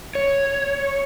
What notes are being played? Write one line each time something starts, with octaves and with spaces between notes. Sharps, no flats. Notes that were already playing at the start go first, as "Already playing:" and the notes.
C#5